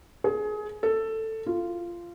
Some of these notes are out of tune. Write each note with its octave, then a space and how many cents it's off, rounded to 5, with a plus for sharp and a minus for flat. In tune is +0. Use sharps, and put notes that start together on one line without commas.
G#4 +25
A4 +10
F4 -15